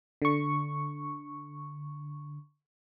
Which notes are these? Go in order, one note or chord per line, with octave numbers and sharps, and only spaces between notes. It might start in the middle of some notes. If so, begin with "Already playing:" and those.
D3 C#6